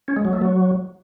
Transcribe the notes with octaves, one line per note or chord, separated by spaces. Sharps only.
C#4
G#3
F#3
A3
F#3